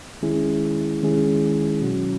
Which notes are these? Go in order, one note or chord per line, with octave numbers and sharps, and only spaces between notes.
D#3 G#3 C#4 E4 G#4
D#3 G#3 C#4 E4 G#4
B2 F#3 C#4 F#4